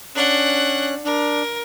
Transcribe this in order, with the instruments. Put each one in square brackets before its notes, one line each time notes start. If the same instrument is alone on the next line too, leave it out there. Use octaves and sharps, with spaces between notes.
[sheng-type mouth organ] C#4 F#6 [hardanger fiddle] D4 F#5
[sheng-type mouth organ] D4 [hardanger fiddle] A#4